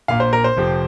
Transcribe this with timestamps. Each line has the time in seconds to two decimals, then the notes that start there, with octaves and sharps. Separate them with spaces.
0.08 A#1 A#2 A#3 F5
0.20 C5
0.33 A#4
0.44 C5
0.57 F1 F2 F3 C4 G4